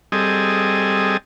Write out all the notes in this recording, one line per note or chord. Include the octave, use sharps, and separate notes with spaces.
G3 C4 G#4 A4 D#5